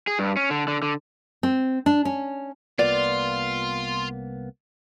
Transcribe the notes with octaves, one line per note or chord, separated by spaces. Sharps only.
G#4
G2
C#4
D3
D3
D3
C4
D4
C#4
C2 A#3 B3 F4 D5